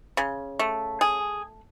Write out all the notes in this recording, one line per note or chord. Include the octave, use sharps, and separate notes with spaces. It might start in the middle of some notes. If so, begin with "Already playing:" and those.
C#3
A3
G#4